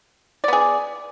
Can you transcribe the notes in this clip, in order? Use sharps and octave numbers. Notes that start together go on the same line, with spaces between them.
B3 G#4 D5